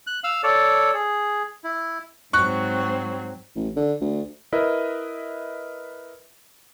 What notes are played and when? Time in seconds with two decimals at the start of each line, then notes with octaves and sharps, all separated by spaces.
0.07 F#6
0.24 F5 E6 F6
0.43 A4 C#5 D5
0.94 G#4
1.64 E4
2.33 G#2 F#3 C4 C#6 F#6
3.55 A1
3.76 D3
4.01 D2
4.53 E4 A#4 B4 D#5 E5